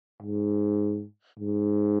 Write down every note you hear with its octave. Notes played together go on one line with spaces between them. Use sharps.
G#2
G#2